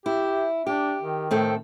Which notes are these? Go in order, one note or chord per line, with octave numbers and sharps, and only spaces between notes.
E4 G4
D4 G4
D#3
A2 C4 A4